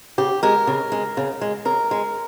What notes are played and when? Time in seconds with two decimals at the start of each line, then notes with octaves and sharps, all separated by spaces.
0.18 C#3 G4
0.43 G#3 A#4
0.67 C#3
0.92 G#3
1.17 C#3
1.41 G#3
1.65 C#3 A#4
1.91 G#3